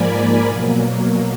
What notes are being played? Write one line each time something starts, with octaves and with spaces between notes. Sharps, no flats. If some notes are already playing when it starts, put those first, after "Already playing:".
Already playing: G#2 F3 A#3 A#4 D5 G#5 B5
B2 F#3 A#3